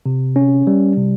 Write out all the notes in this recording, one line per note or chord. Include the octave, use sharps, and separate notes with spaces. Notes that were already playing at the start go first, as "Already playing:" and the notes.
C3
C#4
G3
C3